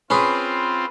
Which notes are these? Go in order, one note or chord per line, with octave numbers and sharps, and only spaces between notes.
C4 C#4 F4 G#4 B4